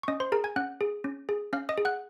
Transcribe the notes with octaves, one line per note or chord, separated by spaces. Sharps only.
C#6
C#4 D#5 D#6
C5 C6
G#4 A#4 A#5
G#5 G#6
C#4 F#5 F#6
G#4
C#4
G#4
C#4 F5 F6
D#5 D#6
G#4
F#5 F#6